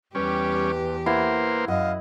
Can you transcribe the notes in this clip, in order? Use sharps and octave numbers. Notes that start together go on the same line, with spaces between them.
E2 G3 C#4 G4 B4
A#3 E4 B4 C5 F#5
F#2 D#5 F5 F#5